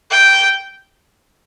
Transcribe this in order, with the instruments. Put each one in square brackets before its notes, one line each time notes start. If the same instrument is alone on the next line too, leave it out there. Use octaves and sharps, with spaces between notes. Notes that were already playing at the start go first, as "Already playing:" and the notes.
[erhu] G5